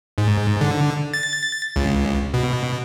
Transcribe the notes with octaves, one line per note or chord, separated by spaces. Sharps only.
G#2
D3
A6
C#2
B2